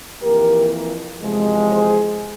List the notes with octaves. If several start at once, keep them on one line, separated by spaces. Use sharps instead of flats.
F2 E3 A#3 G4 A#4
E2 C3 F3 G#3
G#4 C5